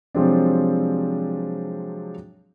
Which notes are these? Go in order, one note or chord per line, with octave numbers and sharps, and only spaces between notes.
C3 F3 F#3 G#3 C4 D4